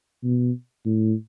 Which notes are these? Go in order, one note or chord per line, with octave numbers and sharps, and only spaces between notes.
B2
A2